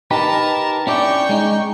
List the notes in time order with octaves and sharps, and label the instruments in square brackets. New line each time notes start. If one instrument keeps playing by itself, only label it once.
[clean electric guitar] D#4 G4 B4 [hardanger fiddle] A#4 A5
[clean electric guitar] C#4 E4 D5 [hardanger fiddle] G5 C#6
[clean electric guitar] G#3 C#4 D#4